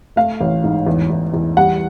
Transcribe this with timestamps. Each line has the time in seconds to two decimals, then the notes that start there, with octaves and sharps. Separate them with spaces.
0.16 A3 F5
0.41 A1
0.64 G#2
0.87 E2
1.10 E2
1.34 E2
1.57 G3 F#5